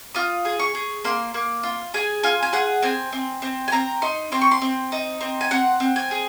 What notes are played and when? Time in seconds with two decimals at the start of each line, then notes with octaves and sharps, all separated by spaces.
0.15 F4 D#6
0.45 G#4
0.60 C#6
0.75 G#4
1.04 A#3 C6
1.34 A#3
1.63 F4
1.94 G#4 G#5
2.23 F4 G#5
2.43 G#5
2.53 G#4 F#5
2.83 C4 G#5
3.13 C4
3.42 C4
3.68 G#5
3.72 C4 A#5
4.02 D#4 C6
4.32 C4 C6
4.41 C#6
4.51 C6
4.62 C4
4.92 D#4
5.21 C4
5.41 G#5
5.51 C4 F#5
5.80 C4
5.96 G#5
6.11 G#4